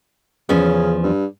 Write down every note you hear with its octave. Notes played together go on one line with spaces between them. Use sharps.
E2 C#3 F3 C#4
G2